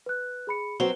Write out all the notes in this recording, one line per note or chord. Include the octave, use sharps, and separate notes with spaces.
B4 F#6
G#4 B5 C#7
F#3 C4 F#4 B4 G7